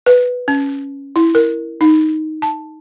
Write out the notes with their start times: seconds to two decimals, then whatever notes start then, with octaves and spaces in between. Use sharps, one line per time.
0.06 B4
0.48 C#4
1.16 E4
1.35 A#4
1.81 D#4
2.42 A5